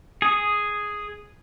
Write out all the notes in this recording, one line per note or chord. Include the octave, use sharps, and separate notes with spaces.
G#4 D#6